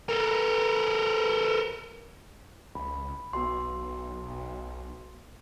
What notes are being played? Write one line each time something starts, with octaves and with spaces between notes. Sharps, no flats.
A4 A#4
C#2 B5
B1 B3 F#4 C6